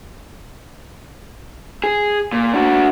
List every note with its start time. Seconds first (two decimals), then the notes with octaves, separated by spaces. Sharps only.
1.84 G#4
2.33 A#2
2.53 D4 F#4